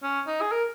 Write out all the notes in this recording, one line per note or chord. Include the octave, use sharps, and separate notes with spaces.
C#4
D#4
G#4
A#4